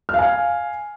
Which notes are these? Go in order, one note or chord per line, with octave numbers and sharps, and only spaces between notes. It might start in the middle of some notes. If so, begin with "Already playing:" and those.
F5 G#5 F6